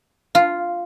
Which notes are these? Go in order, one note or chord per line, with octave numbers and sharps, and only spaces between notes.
F4